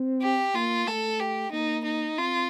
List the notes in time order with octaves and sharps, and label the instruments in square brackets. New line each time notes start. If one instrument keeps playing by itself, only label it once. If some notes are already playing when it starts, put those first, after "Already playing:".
Already playing: [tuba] C4
[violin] G4
[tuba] A#3 [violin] F4
[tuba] A3 [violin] A4
[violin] G4
[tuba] A#3 [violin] D#4
[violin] D#4
[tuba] C4 [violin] F4